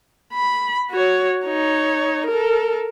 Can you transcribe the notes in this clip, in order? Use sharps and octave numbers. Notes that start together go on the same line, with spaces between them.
B5
F#4 C#5
D#4 C#5
A4 A#4